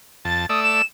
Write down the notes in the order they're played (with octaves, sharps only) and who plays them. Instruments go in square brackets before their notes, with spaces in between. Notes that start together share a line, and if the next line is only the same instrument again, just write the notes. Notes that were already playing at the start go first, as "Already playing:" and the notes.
[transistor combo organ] F2 A5 [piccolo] A6
[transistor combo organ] A3 D5 E5 [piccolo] D#6
[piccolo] E7